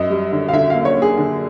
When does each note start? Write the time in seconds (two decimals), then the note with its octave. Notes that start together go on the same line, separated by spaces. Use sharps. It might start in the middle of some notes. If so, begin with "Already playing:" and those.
Already playing: F#2 D#5
0.10 G3
0.32 D3
0.48 F5
0.53 D3 E5
0.70 A#3 F5
0.85 C#5
0.96 A#3
1.02 G#4
1.18 D3